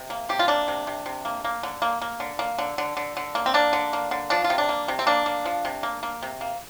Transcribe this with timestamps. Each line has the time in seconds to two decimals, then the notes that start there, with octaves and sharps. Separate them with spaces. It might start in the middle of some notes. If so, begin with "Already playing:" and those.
Already playing: C3
0.10 A#3
0.29 C3 G4
0.39 F4
0.48 A#3 D4
0.68 C3
0.87 C3
1.06 C3
1.25 A#3
1.45 A#3
1.63 D3
1.82 A#3
2.02 A#3
2.20 D3
2.39 A#3
2.58 D3
2.78 D3
2.97 D3
3.17 D3
3.35 A#3
3.46 C4
3.54 A#3 D4
3.73 D3
3.93 A#3
4.11 D3
4.30 F3 D4
4.44 F4
4.50 C3
4.58 D4
4.69 A#3
4.88 C3
4.99 C4
5.07 A#3 D4
5.26 A#3
5.45 F3
5.65 C3
5.83 A#3
6.03 A#3
6.23 C3
6.41 A#3